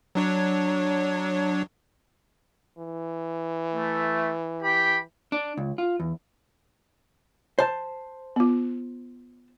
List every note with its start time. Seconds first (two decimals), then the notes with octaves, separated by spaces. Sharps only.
0.15 F#3 D4 C#5
2.79 E3
3.74 A3
4.63 G4 G5 B5
5.32 D4
5.57 C#2
5.78 F4
6.00 E2
7.59 C5 A5
8.36 B3 F4